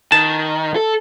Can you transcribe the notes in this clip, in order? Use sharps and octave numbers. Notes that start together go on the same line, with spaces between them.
D#3 A5
A4